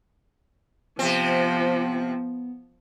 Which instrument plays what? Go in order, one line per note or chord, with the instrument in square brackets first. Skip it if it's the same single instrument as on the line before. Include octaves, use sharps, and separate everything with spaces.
[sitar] C3 C4 [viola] F3 [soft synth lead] B3